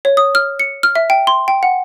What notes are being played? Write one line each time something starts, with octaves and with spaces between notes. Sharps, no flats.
C#5
D#6
F6
C#7
F6
E5
G5
C6
G5
F#5